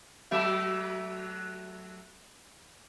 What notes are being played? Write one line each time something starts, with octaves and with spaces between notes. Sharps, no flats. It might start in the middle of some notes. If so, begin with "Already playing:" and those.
F#3 A3 E5